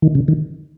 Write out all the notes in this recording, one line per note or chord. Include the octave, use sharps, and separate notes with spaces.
D#3
C#3
D#3